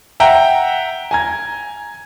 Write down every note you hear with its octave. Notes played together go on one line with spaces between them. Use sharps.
E5 F#5 G5 A#5
G#5 A#5 G#6